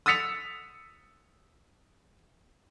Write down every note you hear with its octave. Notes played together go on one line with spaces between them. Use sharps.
D#6 E6 A6 B6 C#7 F7